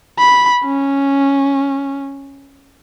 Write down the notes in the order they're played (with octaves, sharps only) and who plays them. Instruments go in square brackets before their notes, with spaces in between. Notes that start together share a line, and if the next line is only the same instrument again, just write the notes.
[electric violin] B5
C#4